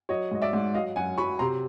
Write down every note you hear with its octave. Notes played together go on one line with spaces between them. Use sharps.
F#3 C#5 D#5
G#2 D#5
D5 E5
G#2
F#3 D#5 F5
F#2 F#5 G#5
F#3 B5 C#6
C3 A#5 C6